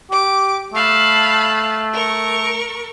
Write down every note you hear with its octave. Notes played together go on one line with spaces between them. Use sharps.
G4 D6
A3 F5 A5 B5
A#4 C#6